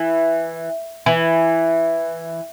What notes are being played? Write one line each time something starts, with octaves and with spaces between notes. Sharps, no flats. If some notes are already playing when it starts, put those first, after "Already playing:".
Already playing: E3
E3